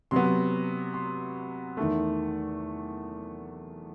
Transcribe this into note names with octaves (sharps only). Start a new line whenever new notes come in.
C3 F#3 B3 C6
C6
E2 D#3 A3